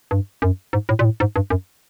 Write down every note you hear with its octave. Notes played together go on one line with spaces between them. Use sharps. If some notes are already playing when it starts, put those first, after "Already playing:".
G2
F#2
G#2
A2
A#2
A2
G#2
G2
F#2